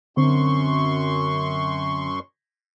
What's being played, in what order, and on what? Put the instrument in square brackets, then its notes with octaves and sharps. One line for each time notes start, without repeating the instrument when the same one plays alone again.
[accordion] F#2 C6 C#6 [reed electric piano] D3 C4